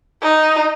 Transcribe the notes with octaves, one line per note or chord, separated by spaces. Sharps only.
D#4